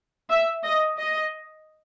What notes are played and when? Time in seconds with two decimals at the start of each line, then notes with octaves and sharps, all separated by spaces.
0.31 E5
0.64 D#5
0.98 D#5